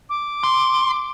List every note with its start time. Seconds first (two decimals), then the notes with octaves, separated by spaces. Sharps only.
0.09 D6
0.44 C6